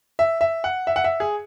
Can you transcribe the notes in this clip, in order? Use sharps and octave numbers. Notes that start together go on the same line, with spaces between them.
E5
E5
F#5
E5
F#5
E5
G#4